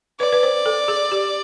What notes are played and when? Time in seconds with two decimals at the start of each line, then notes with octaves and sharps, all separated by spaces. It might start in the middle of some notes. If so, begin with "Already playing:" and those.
0.20 B4 D5
0.33 B4
0.43 C5
0.66 A4
0.88 G#4
1.12 G4